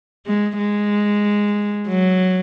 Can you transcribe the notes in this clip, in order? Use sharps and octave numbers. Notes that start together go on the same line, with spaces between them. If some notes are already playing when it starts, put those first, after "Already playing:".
G#3
G#3
F#3